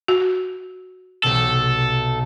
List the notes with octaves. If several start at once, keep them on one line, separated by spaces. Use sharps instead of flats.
F#4
B1 C3 A4